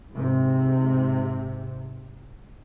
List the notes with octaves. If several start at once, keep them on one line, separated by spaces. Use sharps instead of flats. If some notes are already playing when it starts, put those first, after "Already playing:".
G#2 C3